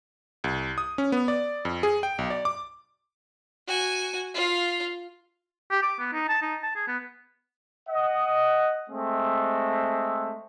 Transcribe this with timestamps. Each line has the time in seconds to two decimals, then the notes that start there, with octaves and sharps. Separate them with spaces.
0.44 C2
0.78 D#6
0.98 C#4
1.12 B3
1.28 D5
1.65 F2
1.83 G#4
2.03 G5
2.18 B1
2.30 D5
2.45 D6
3.67 F#4 G#5
4.34 F4 F5
5.71 G4
5.83 D6
5.99 B3
6.13 D#4
6.29 A5
6.42 D#4
6.63 A5
6.76 G#4
6.88 B3
7.89 D#5 F#5
8.90 G#3 A3 C4